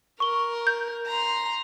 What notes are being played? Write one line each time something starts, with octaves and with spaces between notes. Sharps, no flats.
A#4 C#6 G7
G6
A#5 C6